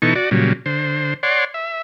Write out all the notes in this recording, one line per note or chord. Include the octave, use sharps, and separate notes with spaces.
B2 E3 D#4 A4 C#6
F#4 D5
A#2 C#3 F#3 G3
D3 C5
C#5 D5 F#5 C6
E5